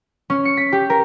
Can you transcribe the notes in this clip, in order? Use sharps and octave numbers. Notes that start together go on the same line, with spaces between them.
C#4
C#7
B6
G4
A#4